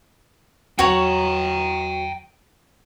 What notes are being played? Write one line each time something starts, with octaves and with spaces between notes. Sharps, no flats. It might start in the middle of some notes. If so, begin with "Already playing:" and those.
E2 F#3 F#4 C#5 G5 A#5